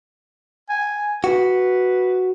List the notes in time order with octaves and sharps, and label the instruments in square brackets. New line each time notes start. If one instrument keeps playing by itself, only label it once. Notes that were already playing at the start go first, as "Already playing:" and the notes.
[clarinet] G#5
[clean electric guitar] F#4 [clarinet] B4